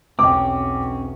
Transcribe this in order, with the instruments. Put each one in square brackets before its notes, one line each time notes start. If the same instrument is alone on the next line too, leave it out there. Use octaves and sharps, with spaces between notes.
[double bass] B1 E2 [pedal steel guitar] C4 C#4 [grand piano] G5 D6